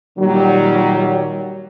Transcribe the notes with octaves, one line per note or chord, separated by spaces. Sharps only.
A#2 D#3 F#3 G3